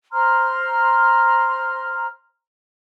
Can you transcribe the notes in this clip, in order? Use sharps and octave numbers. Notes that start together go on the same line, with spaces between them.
C5 A#5 C6 F6